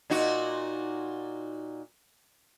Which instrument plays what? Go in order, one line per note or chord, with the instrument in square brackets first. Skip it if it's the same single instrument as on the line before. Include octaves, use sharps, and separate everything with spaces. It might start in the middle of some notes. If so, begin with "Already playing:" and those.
[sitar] A#2 D#4 F#4